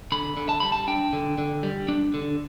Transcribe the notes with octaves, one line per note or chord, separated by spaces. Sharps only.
D3 B5
D3
A5
G3 B5
A5
D4 G5
D3
D3
G3
D4
D3